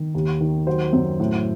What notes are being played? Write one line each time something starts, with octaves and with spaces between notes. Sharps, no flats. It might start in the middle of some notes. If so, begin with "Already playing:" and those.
Already playing: D#3
D#2
D#3
F#3 C5
F#2
A2